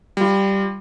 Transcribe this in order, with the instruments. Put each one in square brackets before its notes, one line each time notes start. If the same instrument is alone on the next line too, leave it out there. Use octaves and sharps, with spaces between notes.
[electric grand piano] G3 F4